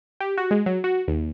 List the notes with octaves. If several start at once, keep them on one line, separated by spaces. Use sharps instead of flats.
G4
F#4
G#3
F#3
F#4
D#2